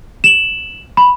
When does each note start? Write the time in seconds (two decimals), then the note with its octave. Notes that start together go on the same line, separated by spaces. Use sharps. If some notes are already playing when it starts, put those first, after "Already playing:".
0.24 E7 F#7
0.97 B5